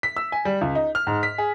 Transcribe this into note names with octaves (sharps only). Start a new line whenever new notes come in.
B6
E6
G#5
G3
C#2
D#4
F6
G#2
B6
G#4